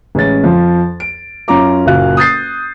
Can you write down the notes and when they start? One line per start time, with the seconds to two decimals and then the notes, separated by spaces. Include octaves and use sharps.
0.15 A1 G#3 C#4 A6
0.44 F2 F3
1.00 D7
1.48 F#2 C#4 F4 A#5 D6
1.86 F#1 A#2 F#4 F5 F#6
2.17 D#6 G6 A6 C7